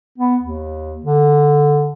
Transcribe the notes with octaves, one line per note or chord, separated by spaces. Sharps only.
B3
D#2
D3